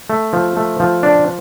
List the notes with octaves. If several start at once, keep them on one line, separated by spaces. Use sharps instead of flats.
A3
F3
A3
F3
D4